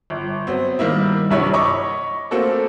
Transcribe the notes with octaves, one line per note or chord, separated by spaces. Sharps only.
G1
F#3 B3 C4
D#3 G3 A#3 E4
A#1 G2 C3 E4 C#5 F#5
C#5 D#5 B5 C#6 D6
A3 A#3 C4 F#4 A4